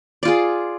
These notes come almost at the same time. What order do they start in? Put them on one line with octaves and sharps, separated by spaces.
D5 F4 G#4